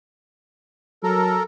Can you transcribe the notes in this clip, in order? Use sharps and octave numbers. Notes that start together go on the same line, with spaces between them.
F#3 A4 A#4